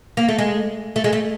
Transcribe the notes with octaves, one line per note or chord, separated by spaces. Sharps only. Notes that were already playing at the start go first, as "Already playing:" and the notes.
A#3
A3
G#3
A3
G#3
A3